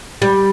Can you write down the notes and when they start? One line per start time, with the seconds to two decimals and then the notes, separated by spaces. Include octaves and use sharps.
0.22 G3